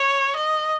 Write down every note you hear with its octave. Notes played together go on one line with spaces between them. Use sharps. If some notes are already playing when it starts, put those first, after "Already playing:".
Already playing: C#5
D#5